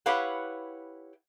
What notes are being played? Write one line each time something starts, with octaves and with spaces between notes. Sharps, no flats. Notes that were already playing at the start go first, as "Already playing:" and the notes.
E4 G4 B4 C#5 F5 F#5